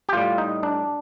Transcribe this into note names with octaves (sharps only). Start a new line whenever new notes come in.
G4
A2 G3 F4
D#4
D4